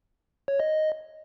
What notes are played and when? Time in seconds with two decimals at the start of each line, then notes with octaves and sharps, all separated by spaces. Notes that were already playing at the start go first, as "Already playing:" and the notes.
0.48 C#5
0.60 D#5